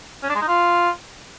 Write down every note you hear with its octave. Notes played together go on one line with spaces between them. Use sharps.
C#4
D4
G#3
D#4
F4